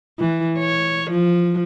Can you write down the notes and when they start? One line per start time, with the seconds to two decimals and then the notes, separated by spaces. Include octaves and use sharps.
0.19 E3
0.59 C#5
1.11 F3